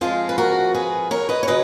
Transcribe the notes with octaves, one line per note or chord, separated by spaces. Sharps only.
F2 F3 G#3 F4 G#4
B4
F#4 A#4
G#4 B4
A#4 C#5
B4 D#5
C#5
C#3 F#3 B4 D#5